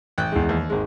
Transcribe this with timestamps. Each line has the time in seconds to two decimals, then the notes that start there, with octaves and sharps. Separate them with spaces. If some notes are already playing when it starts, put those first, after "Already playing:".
0.18 A1 G5 F#6
0.32 E2 G#3
0.49 D#2
0.70 G#1 G#3